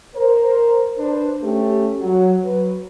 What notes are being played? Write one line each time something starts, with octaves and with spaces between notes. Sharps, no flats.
A#4 C5
D4 B4 C5
A3 C#4 G4
F#3
F#3 B4